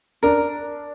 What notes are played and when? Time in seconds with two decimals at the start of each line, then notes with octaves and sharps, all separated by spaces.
0.23 D4 A#4